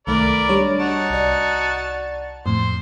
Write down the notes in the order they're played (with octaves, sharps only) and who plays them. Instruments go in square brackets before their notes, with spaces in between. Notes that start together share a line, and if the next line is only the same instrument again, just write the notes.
[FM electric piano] C2 D#3 A3 [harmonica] A#4 B4 D5
[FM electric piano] G3 D4 C#5
[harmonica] D#4 F#4 A5
[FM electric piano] C2 D5
[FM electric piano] F2 A2 [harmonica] C5